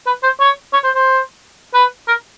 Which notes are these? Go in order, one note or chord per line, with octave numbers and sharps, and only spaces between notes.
B4
C5
C#5
C#5
C5
C5
B4
A#4